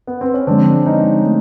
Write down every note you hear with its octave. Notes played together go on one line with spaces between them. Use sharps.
B3
C4
C#4
D3 F3 G#3 C4 D4
C#4 D#4
A3